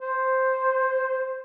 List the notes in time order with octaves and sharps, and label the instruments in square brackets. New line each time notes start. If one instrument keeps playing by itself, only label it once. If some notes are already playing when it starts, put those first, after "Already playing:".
[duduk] C5